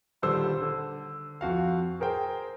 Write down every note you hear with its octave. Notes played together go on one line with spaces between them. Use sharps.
D#1 D3 G3 C5 E6
D3
F2 F#4 F5
G#4 A#4 C5 G5